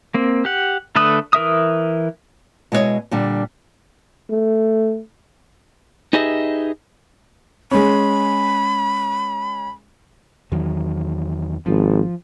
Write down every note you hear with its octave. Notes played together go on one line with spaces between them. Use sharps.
A#3 C4
G4 F#5
D3 A3 A4 B4 D#6
E3 A#4 E5 D#6
B2 G#3 E4 F#4 C#5 D#5
A#2 D3 G3 D4
A3
D#4 G4 G#4 B4 D#5 E5
G#3 C#4 B5
E2 D#3 F#3
G#1 F3